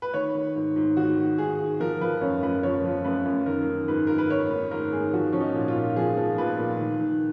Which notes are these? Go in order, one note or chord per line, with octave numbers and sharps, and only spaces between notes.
B4
D#3 C#5
D#3
G#2
G#2
D#3 F#4
D#3
G#2 G#4
G#2
F3 A#4
F3 B4
F#2 C#5
F#2 B4
F3 C#5
F3
F#2 B4
F#2
D#3 A#4
D#3
G#2 B4
G#2 A#4
B4
D#3 C#5
D#3 B4
G#2 A#4
G#2 G#4
F3 F#4
F3 C#4
D#4
A#2
F4
A#2
F3 G#4
F3
A#2 B4
A#2
D#3
D#3